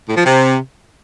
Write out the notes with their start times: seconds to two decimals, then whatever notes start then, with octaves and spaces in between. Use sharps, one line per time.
0.09 A2
0.17 F3
0.24 C3